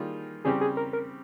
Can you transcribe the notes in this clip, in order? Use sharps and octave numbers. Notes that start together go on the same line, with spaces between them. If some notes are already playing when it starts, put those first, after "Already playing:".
Already playing: D#3 G3 A#3 F4 G#4
C#3 G3 C4 G4 G#4
G#4
A#4
A#4